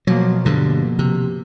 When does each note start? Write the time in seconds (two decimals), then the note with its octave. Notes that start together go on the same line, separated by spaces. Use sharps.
0.07 B2 F3 F#3 A#3
0.45 G2 D3
0.99 C3